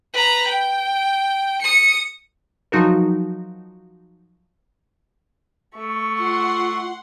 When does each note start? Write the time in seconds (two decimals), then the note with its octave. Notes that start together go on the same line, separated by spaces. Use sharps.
0.13 B4 A#5
0.48 G5
1.62 D#6 C#7
2.72 F3 F#3 D#4 F#4 A#4
5.74 A3 C#6
6.19 F4 F#5 C6